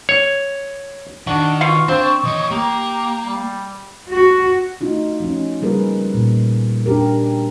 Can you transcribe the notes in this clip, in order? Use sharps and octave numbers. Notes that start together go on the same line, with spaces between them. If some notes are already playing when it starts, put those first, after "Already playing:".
C#5
D#3 D4 F#4 F#5
B2 F4 F5 F#5 C#6
C4 D4 C5
E3 C#5 D#5
A#3 G4 A#5
G3
F#4
A3 D#4 F4 F#4
F3 C#4
C#3 G3 A#3 G#4 A#4 B4
A#2
D4 G4 A#4